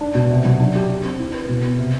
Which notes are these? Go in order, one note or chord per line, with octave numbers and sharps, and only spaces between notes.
D4
B2
C3
F#3
D4
G4
G4
C4
E4
B4
B2
B3
C3